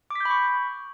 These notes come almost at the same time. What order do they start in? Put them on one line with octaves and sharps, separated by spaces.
D6 B6 G6 B5 C#6